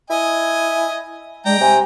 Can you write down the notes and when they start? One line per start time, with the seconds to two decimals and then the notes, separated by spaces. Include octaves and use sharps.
0.10 E4 D#5 G#5
1.46 G#3 D4 G5 A#5
1.61 C3 G#5